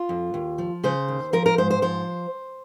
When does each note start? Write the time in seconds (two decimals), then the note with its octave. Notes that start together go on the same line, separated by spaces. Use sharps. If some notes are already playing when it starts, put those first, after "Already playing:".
Already playing: F4
0.09 F2
0.34 D#2
0.58 F3
0.84 C#3 C5
1.08 D#2
1.33 F3 A#4
1.46 A#4
1.58 G#2 C5
1.70 C5
1.82 F3 C5